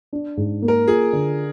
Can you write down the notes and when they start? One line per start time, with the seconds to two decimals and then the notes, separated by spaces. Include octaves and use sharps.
0.13 D4
0.37 G#2
0.62 A#3
0.68 A#4
0.87 F4 G#4
1.13 D3